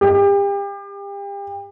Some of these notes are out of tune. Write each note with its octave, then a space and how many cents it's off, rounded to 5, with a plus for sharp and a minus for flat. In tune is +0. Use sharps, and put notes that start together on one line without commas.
G4 +35